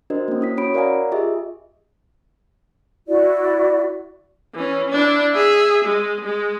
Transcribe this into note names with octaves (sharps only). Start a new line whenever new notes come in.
D4 F#4 A#4 C5 D#5
A#3 C#4
E4 D#6 B6
C#4 F#4 C#5 B5 D7
A#4 D5 F5 F#5 G#5 A#5
F4 G4 G#4 D#5 E5
E4 F#4 D5
E3 C#4
D4 E4
G#4 E5
G#3
G#3